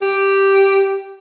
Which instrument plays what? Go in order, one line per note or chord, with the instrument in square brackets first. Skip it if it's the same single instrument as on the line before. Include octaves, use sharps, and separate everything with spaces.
[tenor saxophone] G4